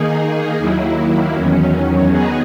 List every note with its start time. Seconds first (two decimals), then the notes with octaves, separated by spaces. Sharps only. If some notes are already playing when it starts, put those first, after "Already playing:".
Already playing: D#3 A#3 D#4 G#4
0.59 D#2 D#3 F#3 A#3 E4
1.34 E2 D#3 F#3 C#4
2.09 D#3 F#3 B3 D#4 G#4